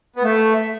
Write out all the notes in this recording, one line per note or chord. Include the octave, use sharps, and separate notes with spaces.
B3
A3 E5 F5